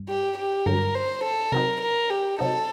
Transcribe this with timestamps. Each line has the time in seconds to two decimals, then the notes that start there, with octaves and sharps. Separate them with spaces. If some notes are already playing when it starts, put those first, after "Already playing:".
Already playing: G2
0.09 G4
0.37 G4
0.66 G2 D3 F#3 A#4
0.95 C5
1.24 A4
1.52 C3 F#3 C4 D#4 A#4
1.81 A#4
2.10 G4
2.39 C3 F#3 C4 D#4 A4